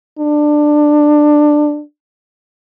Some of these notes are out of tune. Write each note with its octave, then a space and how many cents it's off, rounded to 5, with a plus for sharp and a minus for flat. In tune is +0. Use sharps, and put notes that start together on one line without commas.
D4 +15